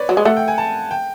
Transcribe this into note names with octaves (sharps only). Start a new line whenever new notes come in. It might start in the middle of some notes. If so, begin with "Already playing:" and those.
Already playing: B4 C#5 D5
F#3
G#3
A3 F#5
G5
G#5
A5
G5